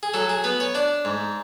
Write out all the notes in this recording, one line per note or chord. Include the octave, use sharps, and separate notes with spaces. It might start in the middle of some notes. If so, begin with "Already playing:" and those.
G#4
F#3 A4
G#4
B3 B4
C#5
D4 D5
G#2